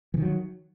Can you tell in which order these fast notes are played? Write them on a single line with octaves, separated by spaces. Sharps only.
E3 D#3 F#3